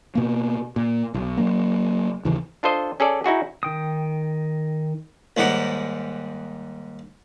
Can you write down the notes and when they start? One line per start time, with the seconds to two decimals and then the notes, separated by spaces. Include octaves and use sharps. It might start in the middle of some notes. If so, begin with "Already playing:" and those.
0.15 B2 A#3
0.76 A#2
1.14 B1
1.37 F#3 A#3
2.25 D#2 C#3 E3
2.63 D4 F4 A4 C5 D#5
3.00 C#4 G#4 A4 D5
3.24 D#4 E4 F#4 G#4
3.63 D#3 G5 D#6
5.37 D#2 G#2 G3 F#5